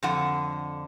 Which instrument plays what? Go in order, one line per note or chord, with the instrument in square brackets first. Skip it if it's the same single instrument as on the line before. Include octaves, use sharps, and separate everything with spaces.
[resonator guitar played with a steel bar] F2 D3 F#5